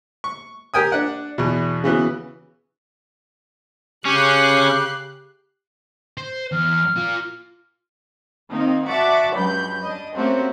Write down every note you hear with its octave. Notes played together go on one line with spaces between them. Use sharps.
C#6
G4 A#4 G5 G#5 D#6
D4 F#5
E2 B2
C#3 E3 B3 F#4
C#3 C#4 G4 F#6 C7
C5
E2 F6
F4 A#4
D#3 A#3 C4 D#4
F#4 D5 E5 F#5 A5 D6
C#2 G2 F#3 B5 G6
D4 D#5
A3 A#3 C4 C#4 F#4 G4